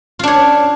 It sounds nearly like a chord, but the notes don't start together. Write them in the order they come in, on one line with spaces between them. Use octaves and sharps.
F4 D4 C#5